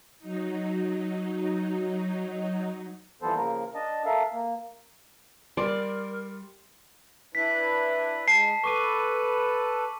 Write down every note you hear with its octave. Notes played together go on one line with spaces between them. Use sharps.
F#3 D#4
E3 F3 G3 B3 A4 C5
C#3 F3 A#3 A#4
D4 D#5 A5
A4 A#4 E5 F5
A#3
G3 A#4 D5 C6 A6
D4 E4 B4 B6
G#3 A5 C7
A4 B4 C#6 D6 D#7